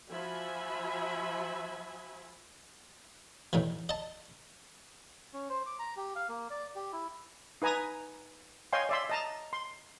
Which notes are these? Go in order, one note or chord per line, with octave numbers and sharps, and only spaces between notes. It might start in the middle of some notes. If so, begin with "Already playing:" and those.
F3 F#4 E5 G#5 B5
A2 D#3 E3
D#5 A5
C#4
C5
D6
A#5
G4
F5
A#3
D5
G4
E4
D#4 B4 G#5 A#5 D#6
C#5 D#5 F5 G5 G#5 C6
D5 E5 C6
D#5 A5 A#5
C6